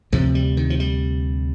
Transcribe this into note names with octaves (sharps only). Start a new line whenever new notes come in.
D2 C3 F3
G3
D#3
F3
G3